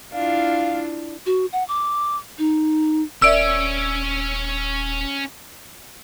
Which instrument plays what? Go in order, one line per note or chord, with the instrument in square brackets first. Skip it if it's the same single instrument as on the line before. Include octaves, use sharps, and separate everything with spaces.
[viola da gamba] D4 E4 F4 [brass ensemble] F5
[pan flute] F#4
F#5
D6
D#4
[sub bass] D#1 [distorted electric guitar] C#4 C#5 [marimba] A#4 D5 E5 [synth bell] E6 D7